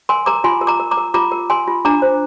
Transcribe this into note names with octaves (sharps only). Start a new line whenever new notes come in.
A#4 G#5 C6
A#4 A#5 D6
F4 G#5 C6
A#4
A#5 D6
A#4
A#5 D6
A#4
F4 A#5 D6
A#4
A#4 G#5 C6
F4
D4 A#5 D6
C5